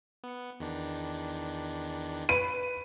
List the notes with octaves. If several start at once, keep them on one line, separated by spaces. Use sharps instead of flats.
B3 C#7
E2 D#3 D4
B4 D#7